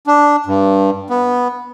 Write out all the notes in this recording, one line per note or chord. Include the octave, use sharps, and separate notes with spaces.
D4
G2
B3